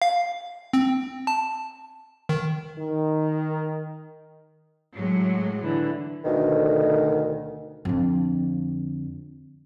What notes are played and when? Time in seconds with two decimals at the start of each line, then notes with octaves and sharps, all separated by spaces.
0.02 F5
0.73 C4
1.27 A5
2.29 D#3
2.78 D#3
4.97 A2 F#3 G#3
5.59 D3 E3
6.25 D2 B2 D#3
7.85 F2 D3